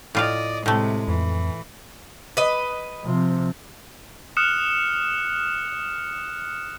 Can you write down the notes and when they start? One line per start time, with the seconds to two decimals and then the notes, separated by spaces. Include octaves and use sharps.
0.15 A2 F4 D5 D#5 F5
0.66 A2 C3 G#3 A3
1.08 F2 E3
2.37 B4 D#5
3.05 C3 F3
4.37 D#6 F6 F#6 C#7 E7